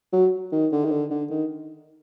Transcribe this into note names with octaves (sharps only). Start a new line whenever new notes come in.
F#3
D#3
D3
D#3
D3
D3
D#3